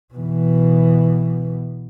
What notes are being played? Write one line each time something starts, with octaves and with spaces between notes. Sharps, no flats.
B2 E3